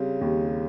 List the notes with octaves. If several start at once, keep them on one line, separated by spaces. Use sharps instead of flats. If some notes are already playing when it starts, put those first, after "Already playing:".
Already playing: C#3 G3 C4
D#2